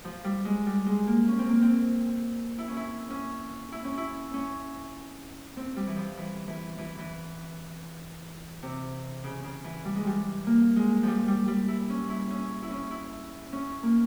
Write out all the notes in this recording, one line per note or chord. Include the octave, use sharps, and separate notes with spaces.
F3
G3
G#3
G3
G#3
A#3
C#4
C4
A#3
C4
E4
C#4
E4
C#4
E4
C#4
E4
C#4
C4
G3
E3
F3
E3
E3
E3
E3
C3
C#3
C#3
E3
G3
G#3
G3
A#3
G#3
F3 G3
G3
G3
E4
C#4
E4
C#4
E4
C#4
E4
C#4
A#3